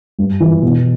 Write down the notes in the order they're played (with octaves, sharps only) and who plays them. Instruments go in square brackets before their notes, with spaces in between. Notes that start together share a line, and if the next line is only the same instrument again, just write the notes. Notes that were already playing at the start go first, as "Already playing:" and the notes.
[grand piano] G2
E3
B2